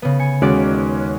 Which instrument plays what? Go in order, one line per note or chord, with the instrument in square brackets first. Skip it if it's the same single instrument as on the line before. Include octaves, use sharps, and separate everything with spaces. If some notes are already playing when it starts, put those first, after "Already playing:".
[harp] C#3 B3
G#5 C#7
[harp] D#2 D5 A6 [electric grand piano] G#3 C#4 F#4